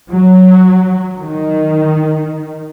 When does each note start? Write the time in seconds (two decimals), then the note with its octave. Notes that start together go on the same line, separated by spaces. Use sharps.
0.10 F#3
1.17 D#3